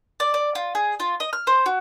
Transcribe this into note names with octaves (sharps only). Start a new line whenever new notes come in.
D5
D5
F4
G#4
F4
D#5
F6
C5
F#4